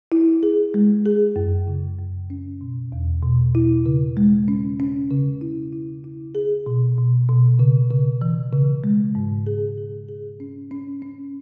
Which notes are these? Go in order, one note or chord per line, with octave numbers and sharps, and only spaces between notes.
E4
G#4
G#3
G#4
F#2
C#3
F#2
C#4
B2
E2
B2
E4
C#3
G#3
C#4
C#4
C#3
E4
E4
E4
G#4
B2
B2
B2
C#3
C#3
E3
C#3
G#3
G#2
G#4
G#4
G#4
C#4
C#4
C#4